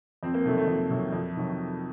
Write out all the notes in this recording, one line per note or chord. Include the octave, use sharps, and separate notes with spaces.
F2 C4
A#3
C3 D#3 F#3 A3
A3
F2
C3 D#3 F#3
F2
C3 D#3 F#3